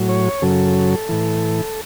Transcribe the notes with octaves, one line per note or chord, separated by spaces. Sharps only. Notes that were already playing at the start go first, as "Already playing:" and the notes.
Already playing: A2 F#3
C#5
F#2 C#3 F#3 A4
A2 E3